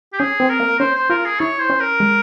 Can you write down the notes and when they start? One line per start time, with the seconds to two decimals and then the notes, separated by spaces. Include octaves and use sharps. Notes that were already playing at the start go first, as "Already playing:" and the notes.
0.13 G4
0.19 C#4 G#4
0.40 C4
0.49 A#4
0.60 A#3
0.79 C#4 C5
0.95 C5
1.10 F4 A#4
1.25 G#4
1.40 E4 C#5
1.60 C5
1.70 C#4
1.80 A#4
2.00 G#3